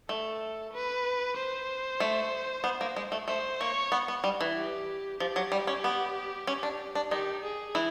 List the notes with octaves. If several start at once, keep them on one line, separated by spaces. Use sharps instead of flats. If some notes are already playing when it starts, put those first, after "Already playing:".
A3 A4
B4
C5
A3
B3
A#3
G#3
A3
A3 C5
A#3 C#5
B3
B3
G3
E3
G4
F3 G4
F#3
G3
C#4
B3
C#4
D4
D4
D#3 D#4 G4
G#4
E3 E4